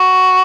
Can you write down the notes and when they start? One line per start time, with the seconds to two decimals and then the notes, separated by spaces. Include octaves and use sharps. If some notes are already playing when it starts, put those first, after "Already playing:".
Already playing: F#4